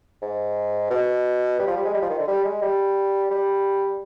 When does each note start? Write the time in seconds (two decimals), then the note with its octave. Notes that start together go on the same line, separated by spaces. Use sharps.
0.22 G#2
0.90 B2
1.59 G3
1.67 F3
1.76 G3
1.85 G#3
1.93 G3
2.02 F3
2.10 D#3
2.19 D3
2.28 G3
2.44 G#3
2.62 G3
3.30 G3